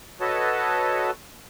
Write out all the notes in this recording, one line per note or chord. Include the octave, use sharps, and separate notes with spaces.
F#4 A4 B4 C#5 D#5 A5